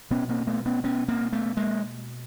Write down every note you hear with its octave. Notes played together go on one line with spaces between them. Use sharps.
B2 B3 C#4
A#3 C4
A3 B3
B3 C#4
B3 C#4
A#3 C4
A3 B3
G#3 A#3